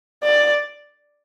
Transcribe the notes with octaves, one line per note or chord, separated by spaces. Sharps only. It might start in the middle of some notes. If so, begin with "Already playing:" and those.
D5